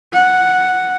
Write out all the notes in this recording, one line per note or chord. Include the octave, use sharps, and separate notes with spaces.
F#5